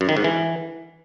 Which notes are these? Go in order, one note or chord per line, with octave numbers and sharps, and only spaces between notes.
F#2
D#3
G#2
E3